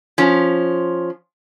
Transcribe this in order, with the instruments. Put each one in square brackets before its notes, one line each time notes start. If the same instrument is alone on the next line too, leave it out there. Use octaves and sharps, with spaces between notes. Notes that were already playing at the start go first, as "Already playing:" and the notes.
[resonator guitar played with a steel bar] F3 C#4